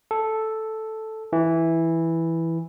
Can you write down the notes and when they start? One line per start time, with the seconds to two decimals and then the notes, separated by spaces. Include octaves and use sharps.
0.11 A4
1.33 E3